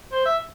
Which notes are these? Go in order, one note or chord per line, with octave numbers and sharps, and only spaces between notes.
C5
E5